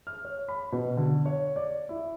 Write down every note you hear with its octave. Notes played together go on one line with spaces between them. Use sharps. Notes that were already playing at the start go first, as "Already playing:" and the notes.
F6
C#5
B5
B2
D3
C#5
D5
E4